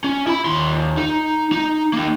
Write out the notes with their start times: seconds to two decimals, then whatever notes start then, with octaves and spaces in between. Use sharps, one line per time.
0.04 C#4
0.27 E4 B5
0.45 D#2 C6
0.97 D#4
1.52 D#4
1.93 A#3 D#4